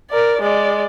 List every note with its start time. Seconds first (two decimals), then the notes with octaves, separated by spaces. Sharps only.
0.11 A#4 D5
0.42 G#3 D5